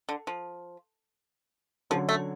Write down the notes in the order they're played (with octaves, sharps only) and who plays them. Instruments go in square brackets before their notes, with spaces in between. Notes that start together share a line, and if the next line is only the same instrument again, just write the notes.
[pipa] D3
F3
[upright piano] D3 F#3 C#4 [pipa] F3
[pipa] A3